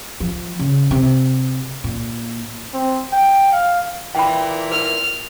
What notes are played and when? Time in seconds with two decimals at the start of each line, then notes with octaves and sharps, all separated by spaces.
0.20 F3
0.59 C#3
0.91 C3
1.84 A#2
2.74 C4
3.12 G5
3.52 F5
4.15 A#2 E3 G5 B5
4.72 A#4 F6